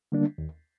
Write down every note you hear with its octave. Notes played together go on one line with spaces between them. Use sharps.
D3 G3 A#3 D4
D#2